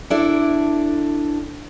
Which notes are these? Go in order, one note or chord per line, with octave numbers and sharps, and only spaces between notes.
D4 E4 A4 D5